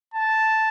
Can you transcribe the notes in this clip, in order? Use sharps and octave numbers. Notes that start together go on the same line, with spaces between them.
A5